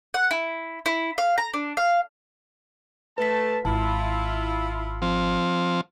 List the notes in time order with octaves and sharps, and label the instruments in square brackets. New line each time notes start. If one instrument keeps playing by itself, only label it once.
[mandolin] F#5
E4
E4
F5
A#5
D4
F5
[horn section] A3 A5 [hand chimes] B4 B6
[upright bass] G#1 [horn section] E4 F4 [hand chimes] A5
[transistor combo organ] F3 C4